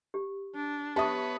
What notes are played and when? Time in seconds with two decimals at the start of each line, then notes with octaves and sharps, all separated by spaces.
0.14 G4
0.55 D4
0.96 B3 G4 B4 C#5 E5 A5 C#6 D#6